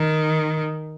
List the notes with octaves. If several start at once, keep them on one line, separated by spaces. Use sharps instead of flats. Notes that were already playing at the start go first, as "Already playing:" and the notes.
Already playing: D#3